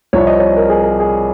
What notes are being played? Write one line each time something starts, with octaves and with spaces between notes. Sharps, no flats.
C2 C3 F3 C4 C#5
D#5
C#5
A#4
G#4
A#4
G#4